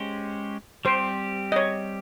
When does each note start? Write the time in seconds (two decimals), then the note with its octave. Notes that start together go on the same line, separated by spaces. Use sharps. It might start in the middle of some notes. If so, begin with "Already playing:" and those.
Already playing: G#3 C#4 G4 C5
0.85 G3 C4 G4 C5
1.52 D#5
1.56 C#5